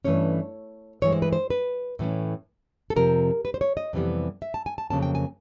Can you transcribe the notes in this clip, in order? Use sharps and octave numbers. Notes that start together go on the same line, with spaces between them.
G2 E3 A3 C#4 C#5
G2 E3 G#3 C#5
C5
B4
C5
B4
A2 E3 A3 C#4
A4
F2 C3 F3 A#4
B4
C5
C#5
D#5
F2 C3 E3 G3 B3
E5
A5
G#5
A5
F2 C#3 F#3 A#3 C#4 A5
G5
G#5